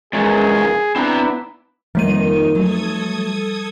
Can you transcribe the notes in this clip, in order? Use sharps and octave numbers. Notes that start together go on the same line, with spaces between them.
E2 A#2 G#3 C#4 G#4
B3 C4 D4 E4 B4 A#5
F2 D#3 F3 G3 A#3 D#4 D#7
F#3 A3 A4 D#6 G#6